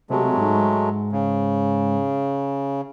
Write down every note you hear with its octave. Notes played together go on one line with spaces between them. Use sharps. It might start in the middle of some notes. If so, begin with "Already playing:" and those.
C3 F#3 G#3 A3
G#2
C#3